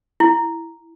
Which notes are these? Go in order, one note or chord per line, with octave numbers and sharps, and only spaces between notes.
E4